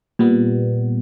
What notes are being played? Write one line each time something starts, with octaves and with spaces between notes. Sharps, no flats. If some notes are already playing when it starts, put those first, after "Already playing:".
A#2 G3 B3